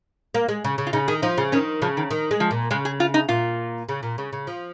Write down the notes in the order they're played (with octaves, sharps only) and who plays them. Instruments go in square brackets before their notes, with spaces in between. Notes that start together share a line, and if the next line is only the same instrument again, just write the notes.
[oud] A#3
G#3
C#3
C#3
[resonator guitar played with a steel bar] F4
[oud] C#3 [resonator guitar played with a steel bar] D#4
[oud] D#3 [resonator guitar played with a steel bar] G#4
[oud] F3 [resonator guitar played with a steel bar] D#4
[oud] C#3 [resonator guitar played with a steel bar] F4
[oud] D#3 [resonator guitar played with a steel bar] C#4
[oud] C#3 [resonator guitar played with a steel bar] F3
[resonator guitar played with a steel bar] D#3
[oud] D#3
G#3
[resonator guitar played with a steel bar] F3
[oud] A#2
[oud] C#3 [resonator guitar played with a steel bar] G#3
[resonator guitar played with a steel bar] G#4
F4
D#4
[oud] A#2 [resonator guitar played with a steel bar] F4
[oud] C#3
A#2
C#3
C#3
F3